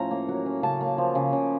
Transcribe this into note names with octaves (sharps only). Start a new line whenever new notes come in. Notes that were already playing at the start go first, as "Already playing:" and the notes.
Already playing: A2 F3 C#4 A#5
A#3
F#3
C#4
C#3 A5
A#3
F3
C#3
C#3